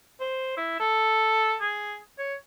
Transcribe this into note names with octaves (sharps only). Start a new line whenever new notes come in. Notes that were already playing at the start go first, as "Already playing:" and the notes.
C5
E4
A4
G#4
C#5